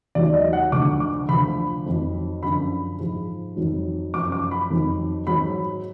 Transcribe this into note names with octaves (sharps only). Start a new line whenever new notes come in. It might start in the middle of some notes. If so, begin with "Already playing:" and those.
D#2 D#3 F#3 D5
D#5
F#5
D2 D3 F3 D6
D6
D2 D3 F3 B5
F2 D#3 F#3
F#2 D3 F3 B5
G#2 F3
F2 D#3 F#3
F#2 F3 D6
D6
B5
F2 D#3 F#3
G#2 D#3 F#3 B5